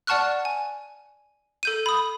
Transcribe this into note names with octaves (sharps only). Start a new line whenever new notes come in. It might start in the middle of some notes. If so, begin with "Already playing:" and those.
D5 F#5 A5 C#6 F6 F#6
G#5
A4 G6 D#7
B5 D#6